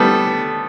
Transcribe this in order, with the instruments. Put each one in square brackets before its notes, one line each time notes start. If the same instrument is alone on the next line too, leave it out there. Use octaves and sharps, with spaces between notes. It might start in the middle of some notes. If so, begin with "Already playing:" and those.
Already playing: [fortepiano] G3 A3 B3 [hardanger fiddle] A4